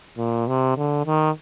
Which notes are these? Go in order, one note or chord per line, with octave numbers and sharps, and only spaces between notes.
A#2
C3
D3
D#3